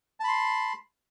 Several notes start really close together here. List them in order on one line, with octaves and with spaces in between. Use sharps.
A5 B5 C6